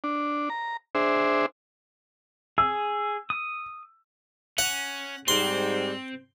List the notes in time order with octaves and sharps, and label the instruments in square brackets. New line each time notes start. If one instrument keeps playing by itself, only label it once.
[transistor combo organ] D4
A#5
D4 G#4 C5 E5
[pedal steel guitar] G#4 [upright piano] E6
[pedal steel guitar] D#6
[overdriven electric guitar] C#4 [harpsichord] F#5
[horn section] G#2 G3 [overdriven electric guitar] C4 [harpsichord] C6